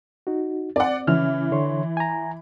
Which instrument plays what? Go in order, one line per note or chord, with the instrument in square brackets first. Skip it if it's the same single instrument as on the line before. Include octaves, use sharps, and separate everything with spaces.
[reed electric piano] D#4 F#4
[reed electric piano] C4 [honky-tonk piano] D5 F#5
[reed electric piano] C#3 C#4 F6 [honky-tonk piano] E3
[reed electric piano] D3 C#5 C6
G#5 A#5